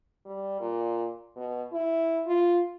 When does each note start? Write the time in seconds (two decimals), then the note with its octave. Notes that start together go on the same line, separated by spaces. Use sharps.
0.25 G3
0.60 A#2
1.37 B2
1.72 E4
2.27 F4